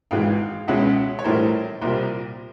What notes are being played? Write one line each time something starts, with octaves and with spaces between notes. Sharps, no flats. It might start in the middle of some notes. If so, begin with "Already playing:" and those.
G#1 G#2 E3 G#3 F5 G5
C#2 B2 G#3 C#4 E5 F#5
C#5
A#1 A2 E3 G3 A#4 C5
C2 A#2 G3 A#4 C5